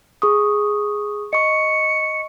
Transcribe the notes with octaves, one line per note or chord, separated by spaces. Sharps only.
G#4 C#6 D#6
D#5 C#6 C#7